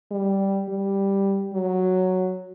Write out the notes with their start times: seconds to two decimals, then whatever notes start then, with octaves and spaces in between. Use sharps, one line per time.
0.11 G3
0.69 G3
1.53 F#3